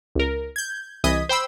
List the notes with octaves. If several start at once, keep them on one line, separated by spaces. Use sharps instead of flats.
C#2 A#4
G6 G#6
C2 E3 D#5 D#6 G#6 B6
C5 G5 B5 E6